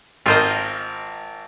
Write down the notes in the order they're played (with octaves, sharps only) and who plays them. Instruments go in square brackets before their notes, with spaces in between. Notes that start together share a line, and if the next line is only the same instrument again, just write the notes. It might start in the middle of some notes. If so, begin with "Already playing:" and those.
[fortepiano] G#1 A#4 [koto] F4 C5 D#5